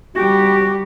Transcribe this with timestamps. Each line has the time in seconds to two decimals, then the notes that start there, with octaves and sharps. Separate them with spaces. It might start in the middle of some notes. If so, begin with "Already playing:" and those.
0.16 G3 F#4 G4